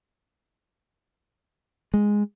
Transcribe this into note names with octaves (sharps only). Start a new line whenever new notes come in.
G#3